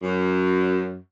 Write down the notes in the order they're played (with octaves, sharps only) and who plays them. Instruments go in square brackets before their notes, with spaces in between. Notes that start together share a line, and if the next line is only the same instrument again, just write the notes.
[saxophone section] F#2